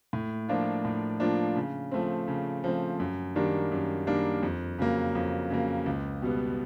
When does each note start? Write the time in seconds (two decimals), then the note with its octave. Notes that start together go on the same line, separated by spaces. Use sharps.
0.13 A2
0.48 F3 A#3 D4 F4
0.85 A2
1.20 F3 A#3 D4 F4
1.56 C#3
1.92 F3 A3 C4
2.28 C#3
2.64 F3 A3 C4
3.00 F#2
3.36 D#3 G3 A#3 D4
3.72 F#2
4.07 D#3 G3 A#3 D4
4.43 F2
4.78 C#3 F#3 A#3
5.15 F2
5.50 C#3 F#3 A#3
5.86 C#2
6.22 B2 G3 B3